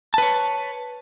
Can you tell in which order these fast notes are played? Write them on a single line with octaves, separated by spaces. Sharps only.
A5 B4 C#5